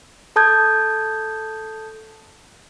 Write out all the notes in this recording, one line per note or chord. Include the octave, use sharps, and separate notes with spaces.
A4 A5 D#6 G6 G#6